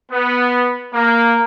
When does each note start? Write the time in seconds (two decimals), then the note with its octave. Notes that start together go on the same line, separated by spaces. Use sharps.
0.10 B3
0.92 A#3